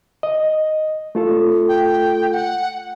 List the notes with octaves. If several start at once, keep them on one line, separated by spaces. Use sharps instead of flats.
D#5
A3 F4 A4
G5
F#5